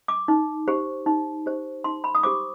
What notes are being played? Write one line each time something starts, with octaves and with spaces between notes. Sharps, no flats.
D6
D#4
G4 C5
D#4
G4 C5
D#4 C6
B5
D#6
G4 C5 D6